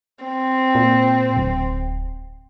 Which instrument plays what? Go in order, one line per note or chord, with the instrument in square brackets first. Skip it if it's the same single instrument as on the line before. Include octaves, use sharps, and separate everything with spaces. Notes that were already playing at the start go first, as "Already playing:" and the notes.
[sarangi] C4
[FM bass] A#2
D1